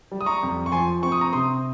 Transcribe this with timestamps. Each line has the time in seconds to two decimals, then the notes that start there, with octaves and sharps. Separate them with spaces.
0.11 G3
0.21 D#6
0.26 A#5 C#6
0.43 F2
0.66 C#6
0.72 F3 G#5 C6
1.02 C4 C#6
1.12 D#6
1.21 A#5 C#6
1.33 C3 C6 D#6